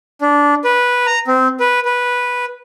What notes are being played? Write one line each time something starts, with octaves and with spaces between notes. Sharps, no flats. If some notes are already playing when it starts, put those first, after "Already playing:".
D4
B4
A#5
C4
B4
B4